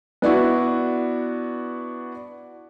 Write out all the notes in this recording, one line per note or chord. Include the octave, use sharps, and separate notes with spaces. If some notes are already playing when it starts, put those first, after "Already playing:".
B3 D4 E4 F#4